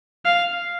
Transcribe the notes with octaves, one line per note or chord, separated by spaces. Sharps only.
F5